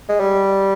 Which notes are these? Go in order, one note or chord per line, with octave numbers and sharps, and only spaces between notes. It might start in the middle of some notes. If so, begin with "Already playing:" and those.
G#3
G3